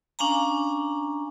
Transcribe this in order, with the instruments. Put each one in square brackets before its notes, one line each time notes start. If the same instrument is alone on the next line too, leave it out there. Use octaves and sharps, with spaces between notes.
[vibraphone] C#4 D4 F5 G#5 A#5